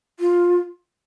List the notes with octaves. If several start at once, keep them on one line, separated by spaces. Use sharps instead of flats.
F4